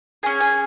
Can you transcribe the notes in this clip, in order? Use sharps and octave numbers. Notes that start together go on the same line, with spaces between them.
C#4 G#4 G#5
G#5